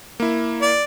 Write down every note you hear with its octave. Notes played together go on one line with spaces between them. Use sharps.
A#3 E4
D5